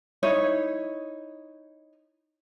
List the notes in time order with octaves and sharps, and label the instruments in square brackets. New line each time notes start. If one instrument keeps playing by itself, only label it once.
[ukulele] D#4 E4 C#5